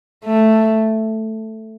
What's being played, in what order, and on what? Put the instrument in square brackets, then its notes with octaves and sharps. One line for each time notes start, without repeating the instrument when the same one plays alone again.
[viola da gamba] A3